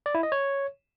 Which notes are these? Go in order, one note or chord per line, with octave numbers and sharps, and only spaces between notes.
D5
E4
D#5
C#5